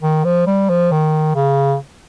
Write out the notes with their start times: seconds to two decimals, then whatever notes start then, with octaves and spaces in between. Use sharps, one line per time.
0.02 D#3
0.24 F3
0.47 G3
0.69 F3
0.92 D#3
1.35 C#3